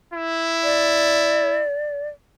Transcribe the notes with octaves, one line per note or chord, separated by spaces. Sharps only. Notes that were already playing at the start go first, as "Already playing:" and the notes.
E4
D5